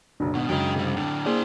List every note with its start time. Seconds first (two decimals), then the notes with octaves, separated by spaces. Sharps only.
0.20 F#1 B1 D4
0.35 G#1 B2
0.49 F#2 C#3 G#3 A#4 G5
0.76 C3 G3
0.97 A2 D3 D4 G5
1.26 A#3 E4 G#4 C5 D5